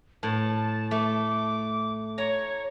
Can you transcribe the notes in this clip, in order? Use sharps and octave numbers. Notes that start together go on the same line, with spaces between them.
A2 A5
A3 D6
C#5 A#5